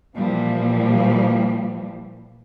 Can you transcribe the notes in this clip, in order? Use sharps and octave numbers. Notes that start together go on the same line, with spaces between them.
A#2 E3 F3 G3